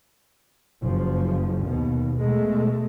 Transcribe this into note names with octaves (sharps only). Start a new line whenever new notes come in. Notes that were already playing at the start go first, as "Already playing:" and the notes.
F#1 F3
D#2 B2
B2 G#3 A3